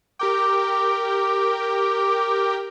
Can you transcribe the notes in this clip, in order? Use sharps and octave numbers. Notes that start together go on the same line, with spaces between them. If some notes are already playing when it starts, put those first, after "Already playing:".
G4 A#4 G5 D6